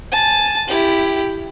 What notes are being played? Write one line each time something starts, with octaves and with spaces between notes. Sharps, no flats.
G#5 A5
E4 G4